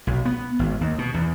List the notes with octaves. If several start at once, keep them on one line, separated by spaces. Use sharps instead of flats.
B1
B3
G#1
D#2
B2
E2